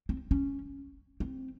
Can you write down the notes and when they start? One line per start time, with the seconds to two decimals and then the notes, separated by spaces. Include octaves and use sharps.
0.09 C4
0.31 C#4
1.20 C4